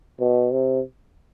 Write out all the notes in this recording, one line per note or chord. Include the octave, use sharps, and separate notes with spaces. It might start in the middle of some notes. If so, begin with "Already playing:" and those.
B2
C3